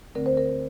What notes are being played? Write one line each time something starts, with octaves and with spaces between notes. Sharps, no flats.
D2 D3 A3 C4 A#4
C5
A#4